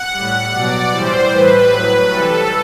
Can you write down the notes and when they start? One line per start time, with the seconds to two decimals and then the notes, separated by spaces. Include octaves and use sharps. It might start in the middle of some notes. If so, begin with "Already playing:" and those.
Already playing: F#5
0.12 A2 G3
0.51 B2 F#3 D5
0.91 A2 E3 G3 C5
1.30 A2 E3 G3 B4
1.69 A2 F#3
2.08 C3 E3 G3 A4